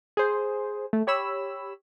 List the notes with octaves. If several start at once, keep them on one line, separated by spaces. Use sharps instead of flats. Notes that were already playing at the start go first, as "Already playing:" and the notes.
G#4 C5
A3
G4 C#5 B5 E6